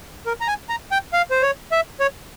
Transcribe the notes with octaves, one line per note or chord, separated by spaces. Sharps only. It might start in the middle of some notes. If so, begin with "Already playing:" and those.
A#4
A#5
G#5
A#5
G5
F5
C5
C#5
E5
C#5